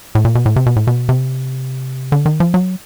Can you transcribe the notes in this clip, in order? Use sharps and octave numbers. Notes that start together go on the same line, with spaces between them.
A2
A#2
B2
A2
C3
B2
A2
B2
C3
D3
D#3
F3
F#3